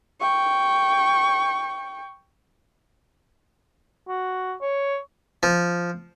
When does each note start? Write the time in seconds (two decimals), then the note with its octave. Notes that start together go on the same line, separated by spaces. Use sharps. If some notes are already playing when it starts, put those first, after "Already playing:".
0.21 G5 C#6
4.08 F#4
4.61 C#5
5.43 F3